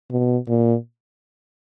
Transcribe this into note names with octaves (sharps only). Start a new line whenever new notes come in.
B2
A#2